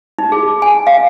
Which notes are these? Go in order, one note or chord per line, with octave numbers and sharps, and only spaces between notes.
D#4
G#4
G#5
F5